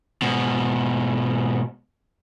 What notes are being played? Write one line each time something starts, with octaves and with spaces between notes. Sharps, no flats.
G#2 B2